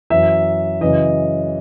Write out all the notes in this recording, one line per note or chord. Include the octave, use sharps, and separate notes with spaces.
F#2 E3 E5
F#2 C#3 E3 D#5